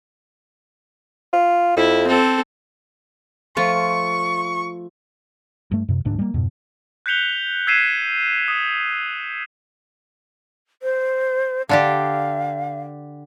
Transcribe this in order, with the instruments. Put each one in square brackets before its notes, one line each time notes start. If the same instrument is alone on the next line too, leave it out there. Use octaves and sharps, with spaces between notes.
[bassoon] F4
[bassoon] F2 [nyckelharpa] E4
[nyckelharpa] C4 A4
[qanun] F3 A3 F4 [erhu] C#6
[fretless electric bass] G2 A3
F#2 C3
D#1 D2 G#2 D4
G3 A#3
F2 G#2 B2
[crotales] F#6 G6 B6 C#7 F7 G7
E6 G#6 B6 C7 D#7 E7
D#6
[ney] C5
[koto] D3 D4 G4 [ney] F5